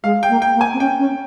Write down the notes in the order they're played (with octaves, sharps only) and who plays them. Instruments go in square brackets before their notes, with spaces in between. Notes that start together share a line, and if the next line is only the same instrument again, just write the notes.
[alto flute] G#3 [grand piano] F5
[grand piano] G5
[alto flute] A#3
[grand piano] G5
[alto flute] A#3
[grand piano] G#5
[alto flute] C4
[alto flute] C#4 [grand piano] G5
[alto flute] C#4